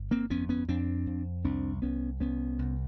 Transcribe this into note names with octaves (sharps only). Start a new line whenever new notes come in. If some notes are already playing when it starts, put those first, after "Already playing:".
Already playing: G1
A#3 C4
F2 B3 C#4
B3 C#4
F2 C4 D4
F2
C2 C4 D4
C2 B3 C#4
C2 B3 C#4
C2